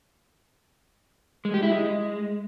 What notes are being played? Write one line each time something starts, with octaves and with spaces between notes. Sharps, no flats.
G#3
G4
E4
G#3